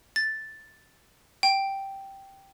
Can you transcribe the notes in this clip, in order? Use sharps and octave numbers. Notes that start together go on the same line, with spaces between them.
A6
G5